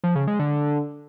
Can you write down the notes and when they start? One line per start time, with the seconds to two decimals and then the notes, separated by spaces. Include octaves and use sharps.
0.04 F3
0.15 C#3
0.27 G#3
0.39 D3